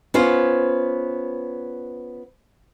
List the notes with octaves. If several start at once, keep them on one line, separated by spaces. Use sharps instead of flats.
B3 C#4 F4 C5